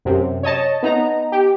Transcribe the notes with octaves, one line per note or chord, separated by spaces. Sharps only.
F#2 C3
C#5 D#5 A5
B3 D#4 A#5
G4